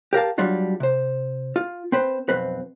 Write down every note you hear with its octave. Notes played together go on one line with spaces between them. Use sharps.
G4 A#4 F5 A5
F#3 G3 D4 F4 F#4
C3 C5
F4
C4 B4 C5
B1 F2 C4 B4